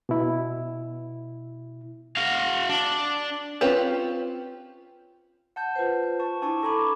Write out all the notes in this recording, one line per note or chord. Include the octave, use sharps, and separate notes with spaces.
B2 E4
F#4 F5
D4
C4 C#4 F4 G4 B4
F#5 A5 G6
F4 B4 C5
A5 C#6
D4 E4 G#5 A5 C#6
A4 G#5 A#5 B5 C#6 D6